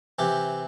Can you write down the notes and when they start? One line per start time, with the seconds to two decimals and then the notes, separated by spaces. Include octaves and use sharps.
0.19 C3 E3 G4